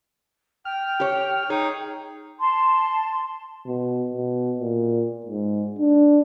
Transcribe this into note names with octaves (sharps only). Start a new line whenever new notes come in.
G5 F6
G4 C#5
D#4 G#4 C#5
A5 C6
B2
B2
A#2
G#2
D4